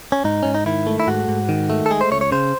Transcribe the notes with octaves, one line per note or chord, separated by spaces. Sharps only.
C#4
G#2 D#4
G#2 C#4
D#4
D#3 E4
A3
E4
G#2 F#4
G#2
D#3
A3
A4
G#3 G#4
C5
C#2 C#5
C#5
C#3 C5